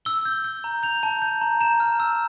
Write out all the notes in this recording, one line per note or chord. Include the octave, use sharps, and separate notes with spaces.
E6 G7
G6
G6
A#5
G6 F7
A5
G6
A#5
A#5 E7
F6
E6